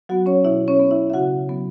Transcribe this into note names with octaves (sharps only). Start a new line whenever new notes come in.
F#3 B3 F#4 F#5
C#4 C#5
B2 E4 E5
C#4 C#5
B3
E4 E5
E5
C#3 F#4 F#5
F#3 B3